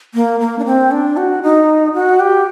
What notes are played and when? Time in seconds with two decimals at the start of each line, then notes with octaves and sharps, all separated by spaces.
0.14 A#3
0.40 A#3
0.59 D4
0.66 C4
0.91 D4
1.17 F#4
1.43 D#4
1.94 F#4
2.20 G4